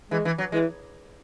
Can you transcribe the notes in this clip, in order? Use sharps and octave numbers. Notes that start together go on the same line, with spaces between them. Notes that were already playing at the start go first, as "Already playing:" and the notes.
E3 G#3
E3
F#3
E3 G#3